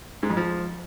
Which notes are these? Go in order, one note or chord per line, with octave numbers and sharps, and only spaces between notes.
G#2
F2
F3